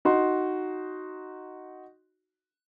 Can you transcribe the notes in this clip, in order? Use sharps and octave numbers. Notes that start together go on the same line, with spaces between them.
D#4 F#4 C6